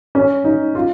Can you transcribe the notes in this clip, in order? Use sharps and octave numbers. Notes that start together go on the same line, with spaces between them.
C#4
D#4
F4